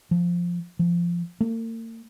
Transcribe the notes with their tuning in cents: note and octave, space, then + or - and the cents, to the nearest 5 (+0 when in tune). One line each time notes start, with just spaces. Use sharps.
F3 +0
F3 -15
A#3 -45